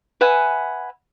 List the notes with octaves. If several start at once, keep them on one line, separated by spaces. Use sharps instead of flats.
B4 E5 F#5 G#5